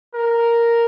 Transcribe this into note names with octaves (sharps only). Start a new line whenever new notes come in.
A#4